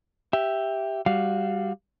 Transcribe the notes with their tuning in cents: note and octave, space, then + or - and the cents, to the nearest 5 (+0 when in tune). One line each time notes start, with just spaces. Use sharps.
G4 +0 E5 +0
G3 +10 F#4 +0 F5 +0